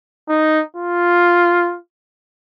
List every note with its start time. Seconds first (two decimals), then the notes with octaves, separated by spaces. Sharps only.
0.28 D#4
0.76 F4